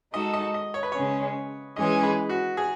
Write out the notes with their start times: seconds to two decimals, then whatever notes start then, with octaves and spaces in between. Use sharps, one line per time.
0.13 G#3 D#4 F#4 A4 D#5
0.33 D#5
0.54 D#5
0.74 C#5
0.83 B4
0.92 C#3 G#3 C#4 C#5
1.76 E3 G#3 C#4 G#4 D#5
2.03 B4
2.29 F#4
2.57 G#4